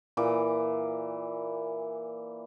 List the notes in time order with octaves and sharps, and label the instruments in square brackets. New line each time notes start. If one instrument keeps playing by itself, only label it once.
[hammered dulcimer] A#2 E3 D6